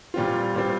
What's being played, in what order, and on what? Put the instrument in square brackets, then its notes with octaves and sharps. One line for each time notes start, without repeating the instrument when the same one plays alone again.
[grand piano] A#2 G3 C4 F4
A#2 G3 C4 F4